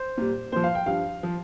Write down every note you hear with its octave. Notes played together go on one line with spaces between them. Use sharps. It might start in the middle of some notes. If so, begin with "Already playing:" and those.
Already playing: C5
A#2 G3
A#2 F3 C5
F5
G5
G2 F3 F5
F3